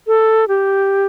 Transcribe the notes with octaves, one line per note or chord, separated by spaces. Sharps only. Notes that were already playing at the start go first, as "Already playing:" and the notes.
A4
G4